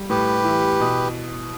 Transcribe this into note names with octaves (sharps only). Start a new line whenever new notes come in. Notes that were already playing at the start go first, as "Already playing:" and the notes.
Already playing: G3
A2 G4 B4
E3
B2